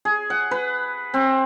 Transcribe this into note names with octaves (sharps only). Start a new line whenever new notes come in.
G#4
F#5
B4
C4